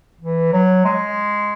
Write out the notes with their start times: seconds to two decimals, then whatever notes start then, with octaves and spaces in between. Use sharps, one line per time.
0.21 E3
0.53 F#3
0.85 G#3